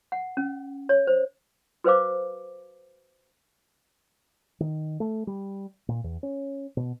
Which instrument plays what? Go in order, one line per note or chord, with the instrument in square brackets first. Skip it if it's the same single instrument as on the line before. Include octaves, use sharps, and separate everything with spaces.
[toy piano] F#5
C#4
C#5
C5
F#4 B4 C5 F5 D6
[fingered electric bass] D#3
A3
G3
A#2
E2
C#4
B2